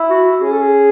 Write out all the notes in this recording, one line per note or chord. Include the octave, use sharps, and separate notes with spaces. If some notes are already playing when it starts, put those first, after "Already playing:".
Already playing: E4
F#4
F#4
C#4 G#4
A4
G#4